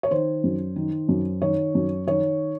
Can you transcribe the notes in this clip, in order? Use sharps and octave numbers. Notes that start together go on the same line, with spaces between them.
C#5
D#3 C5
F#2
D#3
F#2
D#3 C#5
F#2
D#3 C#5